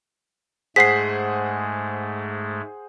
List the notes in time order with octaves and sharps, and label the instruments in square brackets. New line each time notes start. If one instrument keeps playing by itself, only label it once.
[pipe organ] G#2 G#3 A3 [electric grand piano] G#4 C5 F#5 [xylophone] B6 C7